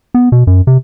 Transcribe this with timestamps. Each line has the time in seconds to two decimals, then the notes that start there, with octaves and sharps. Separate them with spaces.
0.14 B3
0.32 B2
0.47 F#2
0.67 C3